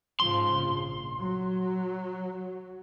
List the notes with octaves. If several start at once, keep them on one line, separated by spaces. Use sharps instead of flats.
G#2 C#3 F3 C6
A#1
F#3